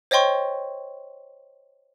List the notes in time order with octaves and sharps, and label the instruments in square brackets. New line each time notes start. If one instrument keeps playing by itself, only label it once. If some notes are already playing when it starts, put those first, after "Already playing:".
[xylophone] C5 C#5 D#5 G5 C6 C#6